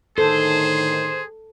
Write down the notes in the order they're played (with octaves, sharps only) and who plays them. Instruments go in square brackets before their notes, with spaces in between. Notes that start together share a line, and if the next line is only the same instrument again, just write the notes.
[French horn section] A2 D3 D#3 [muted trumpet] G#4 [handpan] A4 [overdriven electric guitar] C5